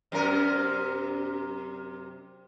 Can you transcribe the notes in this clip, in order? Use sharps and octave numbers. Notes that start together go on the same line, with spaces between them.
F#2 C3 A#4